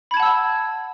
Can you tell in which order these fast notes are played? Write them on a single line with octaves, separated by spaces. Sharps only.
B5 G#6 A5 F#5 E6